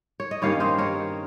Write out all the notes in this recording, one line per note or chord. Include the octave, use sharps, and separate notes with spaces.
C#5
D#5
G2 D#3 A#3 C#4 C#5 F5
C5 D#5
A#4 C#5